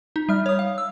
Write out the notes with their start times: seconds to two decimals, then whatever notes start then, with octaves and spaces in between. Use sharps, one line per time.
0.16 D#4
0.29 G3 E5 F6
0.46 C#5 D#6
0.59 F5
0.78 E6